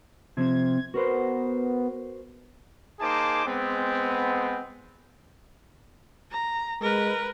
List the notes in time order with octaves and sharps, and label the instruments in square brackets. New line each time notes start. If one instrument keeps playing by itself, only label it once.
[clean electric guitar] C3 F3 C4 [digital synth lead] G#6
[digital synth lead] B3 [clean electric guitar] F#4 A#4 C5
[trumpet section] A#3 D#4 G#4 C5 A5 D6
G#3 B3 C4
[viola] A#5
[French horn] G#3 [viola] A#4 B4